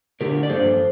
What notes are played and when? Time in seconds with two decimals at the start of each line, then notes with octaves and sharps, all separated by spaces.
0.21 D3 A3 D4 G4 A#4
0.43 D5
0.50 G2 F3 A#3 D4 A4 C5